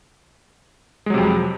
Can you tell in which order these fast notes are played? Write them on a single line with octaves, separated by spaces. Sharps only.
G#3 F#3 C3 F2